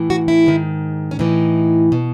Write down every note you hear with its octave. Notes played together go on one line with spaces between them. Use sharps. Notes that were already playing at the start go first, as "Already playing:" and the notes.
Already playing: A2 E3
F#4
E4
G#2 D#3
C#4
A2 E3 D#4
B2